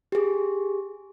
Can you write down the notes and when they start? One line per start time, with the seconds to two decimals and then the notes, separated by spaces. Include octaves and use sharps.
0.12 G4 G#4